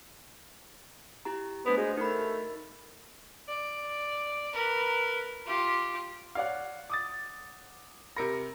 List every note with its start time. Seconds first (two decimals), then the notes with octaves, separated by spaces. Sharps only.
1.25 E4 G4 A#5
1.66 A3 B3 D4 C5
1.77 G#3 F#4
1.97 A3 D#4 A#4 B5
3.48 D5
4.53 A#4 B4
5.47 F4 G4
6.35 C#5 D5 F5 F#5
6.90 D6 D#6 A6
8.16 C3 A#4 B5 A#6 C#7